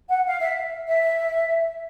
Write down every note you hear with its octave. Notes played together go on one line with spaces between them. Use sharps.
F#5
F5
E5
E5